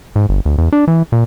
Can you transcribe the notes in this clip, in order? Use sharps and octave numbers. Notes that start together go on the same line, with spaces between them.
G#2
G1
D2
E2
D4
E3
A#2